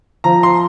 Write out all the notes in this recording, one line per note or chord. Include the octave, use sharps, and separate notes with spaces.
F3 A#5
C6